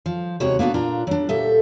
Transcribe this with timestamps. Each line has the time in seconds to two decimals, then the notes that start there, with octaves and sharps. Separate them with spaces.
0.06 F3
0.40 D#2 C3 G#3 F#4 C#5
0.59 A#3 B3 D4 F4 F#4
0.74 A#2 D4 F4 A#5
1.07 F#3 D4
1.29 D2 A#2 G4 A4 E5